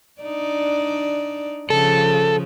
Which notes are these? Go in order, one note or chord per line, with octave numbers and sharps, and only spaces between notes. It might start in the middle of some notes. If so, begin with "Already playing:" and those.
D4 D#4 D5
C#3 F3 A4